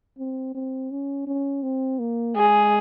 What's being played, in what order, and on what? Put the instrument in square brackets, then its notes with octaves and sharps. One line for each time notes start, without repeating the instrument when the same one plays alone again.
[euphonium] C4
C4
C#4
C#4
C4
A#3
[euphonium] G#3 [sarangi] G#4